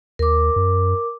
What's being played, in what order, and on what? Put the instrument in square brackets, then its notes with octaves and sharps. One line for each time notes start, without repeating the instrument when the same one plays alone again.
[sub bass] D#2 [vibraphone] A#4 D6
[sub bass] F#2